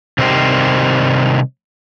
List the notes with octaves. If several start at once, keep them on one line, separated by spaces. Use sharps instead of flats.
C3 D#3 G3 C5 D#5 G5